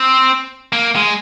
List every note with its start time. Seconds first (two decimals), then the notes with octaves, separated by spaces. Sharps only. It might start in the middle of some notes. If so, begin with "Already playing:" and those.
Already playing: C4
0.73 A#3
0.96 G#3